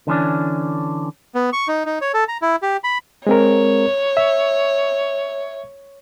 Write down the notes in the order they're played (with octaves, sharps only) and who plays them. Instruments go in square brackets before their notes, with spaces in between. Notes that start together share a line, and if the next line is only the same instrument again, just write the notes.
[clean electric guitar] D3 E3 C#4 D4
[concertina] B3
C#6
D#4
D#4
C#5
A4
A#5
E4
G4
B5
[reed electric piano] G#3 C4 A#4 [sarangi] C#5
[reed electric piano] E5